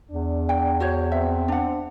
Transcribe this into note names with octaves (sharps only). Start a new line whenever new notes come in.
E2 D4
G5
F#4 C5 C#5
C4 E5
D4 F#5